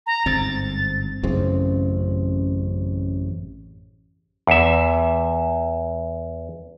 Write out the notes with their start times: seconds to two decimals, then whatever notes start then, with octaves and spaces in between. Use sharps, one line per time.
0.07 A#5
0.26 G1 G#2 C4 A6
1.23 A1 F#2 C#3 C4
4.47 E2 E5